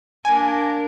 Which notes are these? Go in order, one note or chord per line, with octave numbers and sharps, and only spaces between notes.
A#3 D4 A#4 G#5